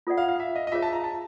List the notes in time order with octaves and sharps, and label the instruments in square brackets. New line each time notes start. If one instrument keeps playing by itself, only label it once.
[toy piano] F4 A4 D5 F#5
[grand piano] F5
F5
E5
D#5
D#5
[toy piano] F4 G#4 C#5 F5 [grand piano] E5
[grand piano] A5
A#5
A5